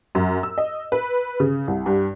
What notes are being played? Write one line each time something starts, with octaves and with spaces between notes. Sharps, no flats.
F#2
E6
D#5
B4
C#3
C2
G2